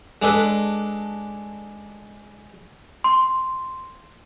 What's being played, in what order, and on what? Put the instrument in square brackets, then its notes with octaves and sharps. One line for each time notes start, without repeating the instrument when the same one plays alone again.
[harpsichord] G#3 D4 A4 B4
[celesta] C6